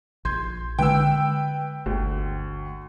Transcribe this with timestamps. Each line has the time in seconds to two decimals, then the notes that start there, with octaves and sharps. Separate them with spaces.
0.25 A#1 C6 G6 G#6
0.79 D3 G#3 B4 G5 E6
1.86 G1 D2